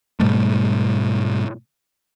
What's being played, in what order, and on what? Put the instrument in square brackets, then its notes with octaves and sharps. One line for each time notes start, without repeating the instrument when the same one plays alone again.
[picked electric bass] G#2 B2 G3 A3